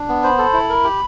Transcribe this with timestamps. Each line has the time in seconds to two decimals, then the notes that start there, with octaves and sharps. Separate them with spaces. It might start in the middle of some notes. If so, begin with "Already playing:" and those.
Already playing: D4
0.09 B3
0.23 C5 B5
0.38 A4
0.53 E4
0.70 A#4
0.84 G4